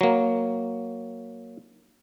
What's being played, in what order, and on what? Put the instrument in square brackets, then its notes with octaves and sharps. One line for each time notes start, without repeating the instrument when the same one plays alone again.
[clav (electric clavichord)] F#3 A#3